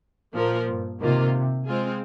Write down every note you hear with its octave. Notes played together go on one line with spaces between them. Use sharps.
A#2 F3 A#3 F4 A#4
G2
C3 D#3 A#3 F4
G#3 C4 F4 G#4